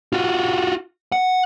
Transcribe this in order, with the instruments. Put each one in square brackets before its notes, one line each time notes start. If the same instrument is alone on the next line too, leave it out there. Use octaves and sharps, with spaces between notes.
[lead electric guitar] F4 F#4
F#5